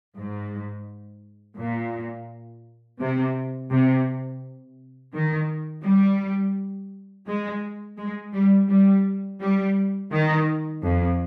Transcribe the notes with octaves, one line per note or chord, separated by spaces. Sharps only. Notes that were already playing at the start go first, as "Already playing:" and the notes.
G#2
A#2
C3
C3
D#3
G3
G#3
G#3
G3
G3
G3
D#3
F2